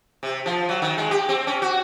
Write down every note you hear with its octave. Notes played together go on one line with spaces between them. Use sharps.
C3
F3
F#3
D#3
G#3
G4
C4
C#4
F#4